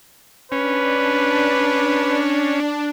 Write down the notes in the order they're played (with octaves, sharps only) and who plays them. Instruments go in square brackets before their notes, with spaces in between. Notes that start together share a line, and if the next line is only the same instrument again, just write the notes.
[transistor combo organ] C#4 [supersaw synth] D4 [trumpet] B4